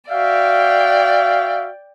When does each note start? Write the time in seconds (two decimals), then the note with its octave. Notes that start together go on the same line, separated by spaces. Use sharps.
0.10 F#4 D5 E5 F5 G5